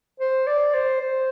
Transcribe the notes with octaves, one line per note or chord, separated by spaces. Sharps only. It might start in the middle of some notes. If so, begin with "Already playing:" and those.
C5
D5
C5
C5